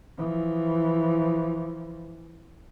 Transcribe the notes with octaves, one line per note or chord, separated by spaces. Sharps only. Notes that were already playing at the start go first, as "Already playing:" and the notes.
E3 F3